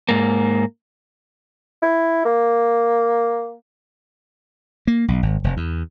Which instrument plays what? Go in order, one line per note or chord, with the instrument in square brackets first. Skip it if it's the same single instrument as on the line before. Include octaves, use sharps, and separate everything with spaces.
[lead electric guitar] G#2 A#3
[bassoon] E4
A#3
[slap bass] A#3
B1
G#1
F1
E2